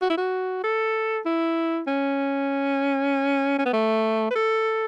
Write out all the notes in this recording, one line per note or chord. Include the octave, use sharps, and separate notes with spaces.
F#4
E4
F#4
A4
E4
C#4
C#4
B3
A3
B4
A4